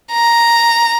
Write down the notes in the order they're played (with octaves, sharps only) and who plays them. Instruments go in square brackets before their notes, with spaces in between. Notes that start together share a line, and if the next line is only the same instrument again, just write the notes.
[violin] A#5